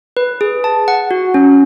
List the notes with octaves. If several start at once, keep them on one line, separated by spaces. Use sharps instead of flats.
B4
G#4
A5
F#5
F#4
C#4